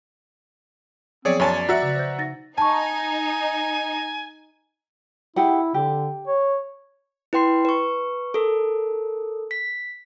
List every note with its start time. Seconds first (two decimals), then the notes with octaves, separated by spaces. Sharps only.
1.25 F3 F#3 B3 C4 G#4 C#5 D5
1.40 F#2 C#5 D5 G#5 A5
1.69 F#4 E5 F#5 A#5
1.82 C#3
1.96 C5 G6
2.18 D#4 A6 A#6
2.58 D#4 G#5 A5 C#6
5.36 E4 G4 G#4 F#5
5.74 D3 G4
6.27 C#5
7.33 E4 B4 G5 C6 C7
7.65 B4 C#6
8.34 A4 A#4
9.51 B6